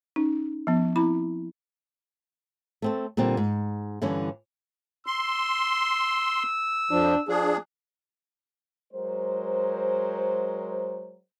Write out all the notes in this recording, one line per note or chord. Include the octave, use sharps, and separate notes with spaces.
C#4 D#4
F3 B3
C4 E4 B5
A3 C4 A4
A#2 D3 G3 C4
G#2
G2 D3 E3 C#4
C6 E6
F2 F3 D4
F3 D4 G#4
F#3 G#3 A#4 C5